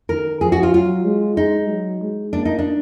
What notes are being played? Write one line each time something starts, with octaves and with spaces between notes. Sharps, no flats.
D#3 A#4
F3 G#4
F#4
F4
F#3 F4
G#3
G#3 D#4
F#3
G#3
A#3 D4
D#4
D4